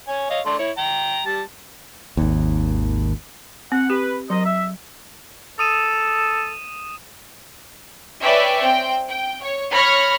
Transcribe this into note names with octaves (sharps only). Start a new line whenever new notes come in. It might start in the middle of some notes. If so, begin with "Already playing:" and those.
C#5 G#5
C#5 D#5 F5
A3 D4 C6
E4 C#5
G5 A#5
G3 A5
G#1 D#2
C4 F#5
G4 B4
F#3 A#4 C5 D#5
E5
A4 D#6 D#7 E7
B4 C#5 D5 E5 G5 G#5
C4 G5
G5
C#5
C#5 B5 C#6 F6 A#6